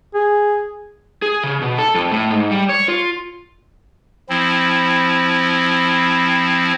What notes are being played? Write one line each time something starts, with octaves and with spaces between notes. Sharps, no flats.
G#4
G#4
C#3
B2
A4
F2
A2
G#2
G3
C#5
F4
F3 C4 E4